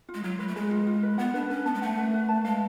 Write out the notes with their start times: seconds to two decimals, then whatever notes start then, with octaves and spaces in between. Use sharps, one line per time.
0.09 F4
0.14 G#3
0.24 F#3 F4
0.39 G#3 B4
0.48 A3
0.56 G#3 G#4
0.71 F4
0.87 F4
1.03 B4
1.18 B3 F#5
1.34 D4 B4
1.50 C#4 B4
1.66 B3 A5
1.74 G#3
1.82 A3 F#5
1.98 B4
2.14 B4
2.29 A5
2.45 G#3 F5